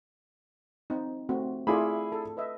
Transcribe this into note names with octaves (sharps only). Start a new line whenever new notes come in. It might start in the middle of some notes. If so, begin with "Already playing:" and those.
C4 D#4
A3 C4 F#4
A3 E4 F4 G#4 D5 B5
A4
B4 D#5 E5